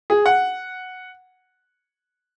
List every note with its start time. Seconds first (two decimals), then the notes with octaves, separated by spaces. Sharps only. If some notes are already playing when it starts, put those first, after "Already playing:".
0.10 G#4
0.26 F#5